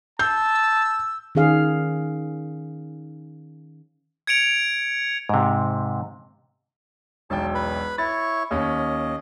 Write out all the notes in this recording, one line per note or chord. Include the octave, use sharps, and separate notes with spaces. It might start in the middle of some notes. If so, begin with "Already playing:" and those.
A5 E6 G6
D#3 C#4 G#4 F5
G#6 C#7 D7 F7
G#2 C3
E1 B1 G5 A5
B4 B5
E4 C#5 C#6 A6
D#2 C#4 D#5